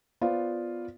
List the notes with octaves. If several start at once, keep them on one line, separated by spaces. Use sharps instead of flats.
B3 F4 C5 D5 F5